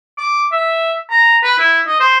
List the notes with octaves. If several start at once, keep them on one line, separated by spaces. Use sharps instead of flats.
D6
E5
A#5
B4
E4
D#5
C5